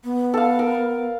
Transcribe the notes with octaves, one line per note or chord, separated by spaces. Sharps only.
B3
A4 F5
A#4